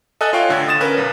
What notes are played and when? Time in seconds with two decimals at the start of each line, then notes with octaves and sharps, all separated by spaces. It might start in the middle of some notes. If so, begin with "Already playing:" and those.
0.21 A4 D#5 E5 G#5 D#6 F#6
0.33 F4 C#5 F5 G5 C#6
0.49 A1 D3 G#6
0.68 D#6 A6 E7
0.81 C#4 A#4 B4
0.97 B1